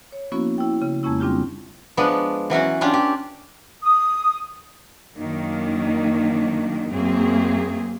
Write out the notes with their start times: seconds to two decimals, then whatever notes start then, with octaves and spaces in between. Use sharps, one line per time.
0.12 C#5
0.32 F3 A#3 B3 C#4 E4 F#4
0.58 E4 G5
0.82 C#3
1.03 F2 G#3 A#3 C#4 E4 E6
1.20 G3 C4 D4 F4 G4
1.97 F3 G#3 B3 D4
2.50 E3 F#3 C#4 F#4
2.81 C#4 D4 F4 G4
2.94 G4
3.83 D#6
5.16 F#2 D#3 A#3 D4
6.91 F#2 A#3 C4 G#4